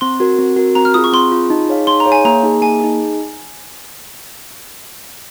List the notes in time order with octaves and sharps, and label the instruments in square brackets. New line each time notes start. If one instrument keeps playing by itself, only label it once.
[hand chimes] C4 [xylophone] C6
[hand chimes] F#4 A#4
C4
F#4 A#4
[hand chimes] C4 [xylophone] A#5
[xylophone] F6
[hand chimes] F4 G#4 [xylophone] D#6
[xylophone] C#6
[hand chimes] C4 [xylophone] C6
[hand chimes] F4 G#4
D#4
G#4 C#5 F5
[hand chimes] D#4 [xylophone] C6
[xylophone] A#5
[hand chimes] G#4 C#5 F5
[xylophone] G#5
[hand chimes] A#3 [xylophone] A#5
[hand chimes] D#4 G#4
[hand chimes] A#3 [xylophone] G#5
[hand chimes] D#4 G#4